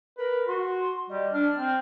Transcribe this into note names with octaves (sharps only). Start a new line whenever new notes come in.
A#4 B4
F#4 C6
G3 D#5
D4 F6
C4